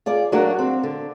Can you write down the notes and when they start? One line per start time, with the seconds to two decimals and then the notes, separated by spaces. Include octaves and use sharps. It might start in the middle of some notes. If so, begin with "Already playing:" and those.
0.06 F4 G#4 D5
0.32 F#3 A3 A#3 D4 F#4
0.59 C4
0.83 D3